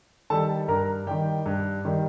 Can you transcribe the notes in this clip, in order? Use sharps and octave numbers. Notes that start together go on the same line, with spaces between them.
D#3 G3 A4 A5
G2 A#4 A#5
D#3 G3 G4 G5
G2
D#3 G3